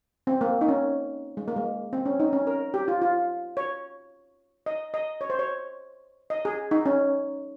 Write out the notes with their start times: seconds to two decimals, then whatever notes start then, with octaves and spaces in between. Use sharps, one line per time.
0.27 C4
0.41 A#3
0.61 D#4
0.68 C#4
1.37 G#3
1.48 A#3
1.56 G#3
1.93 C4
2.06 C#4
2.20 D#4
2.33 C#4
2.47 A#4
2.74 G4
2.88 F4
3.01 F4
3.57 C#5
4.66 D#5
4.94 D#5
5.21 C#5
5.30 C5
5.39 C#5
6.30 D#5
6.45 G#4
6.71 D#4
6.86 C#4